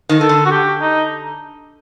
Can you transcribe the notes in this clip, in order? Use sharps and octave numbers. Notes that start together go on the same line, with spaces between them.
D#3
D#3 A4
D3
F#4
G4
D#4